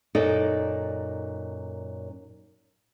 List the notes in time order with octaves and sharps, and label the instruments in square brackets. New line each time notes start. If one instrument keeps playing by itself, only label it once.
[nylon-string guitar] F#2 A#2 D#4 A4 D5